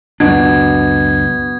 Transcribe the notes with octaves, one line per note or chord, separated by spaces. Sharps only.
C#2 F#2 B2 D4 G#6